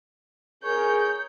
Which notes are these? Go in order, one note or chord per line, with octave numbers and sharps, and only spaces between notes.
G#4 A#4 C#5 G6